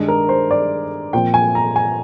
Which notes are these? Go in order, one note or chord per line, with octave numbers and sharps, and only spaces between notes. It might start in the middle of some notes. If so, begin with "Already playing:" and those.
Already playing: G2 D#3 G#3 D4 G#4
A#4
C5
D5
A#2 F3 C4 G5
G#5
A#5
G#5